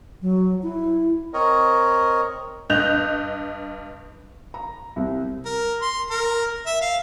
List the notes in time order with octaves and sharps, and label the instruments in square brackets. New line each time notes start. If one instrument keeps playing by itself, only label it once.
[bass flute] F#3
E4
[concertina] C4 A#4 C#5 D#5
[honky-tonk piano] G2 D#5 F#6 G6 F7
[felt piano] A#5
C2
[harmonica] A#4
C6
A#4
E5
F5